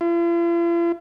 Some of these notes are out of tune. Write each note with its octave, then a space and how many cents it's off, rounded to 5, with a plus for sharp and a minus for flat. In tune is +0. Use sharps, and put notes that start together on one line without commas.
F4 -45